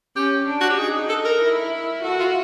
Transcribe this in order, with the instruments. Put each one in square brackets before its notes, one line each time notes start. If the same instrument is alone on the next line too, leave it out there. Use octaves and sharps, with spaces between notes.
[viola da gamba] C#4 [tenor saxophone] G4
[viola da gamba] D4
[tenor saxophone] F#4
G4
[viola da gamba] D#4 [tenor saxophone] G#4
[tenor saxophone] A4
A#4
[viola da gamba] E4
[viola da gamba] F#4 [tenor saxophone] A4
[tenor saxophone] F4